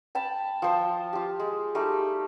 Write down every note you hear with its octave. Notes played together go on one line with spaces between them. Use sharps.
G5 A5 B5
F3 C5
F4 G4
G#3
G3 A3 D#4